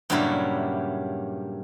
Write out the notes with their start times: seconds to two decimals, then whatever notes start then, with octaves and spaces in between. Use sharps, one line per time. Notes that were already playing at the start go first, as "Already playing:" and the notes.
0.10 G2 A#2 C#3 F#3 G3 E4